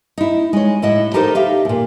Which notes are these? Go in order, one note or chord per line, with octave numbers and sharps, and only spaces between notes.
D#4 E4
G#3 C#5
A2 E4 D#5 F#5
D#4 G4 A4 A#4 C5
G4 E5 F5
D#2 A#2